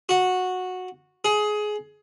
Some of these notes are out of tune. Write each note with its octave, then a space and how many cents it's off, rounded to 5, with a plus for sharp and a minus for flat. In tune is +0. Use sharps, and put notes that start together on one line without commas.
F#4 -10
G#4 +20